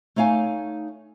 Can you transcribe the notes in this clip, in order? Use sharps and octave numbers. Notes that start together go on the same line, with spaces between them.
A3 D#4 C#5 F5 G#5